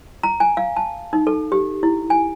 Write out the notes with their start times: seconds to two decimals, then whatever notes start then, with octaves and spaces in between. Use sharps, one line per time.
0.23 A#5
0.40 G#5
0.57 F5
0.76 A5
1.13 D#4
1.27 A4
1.52 G4
1.83 E4
2.10 G#5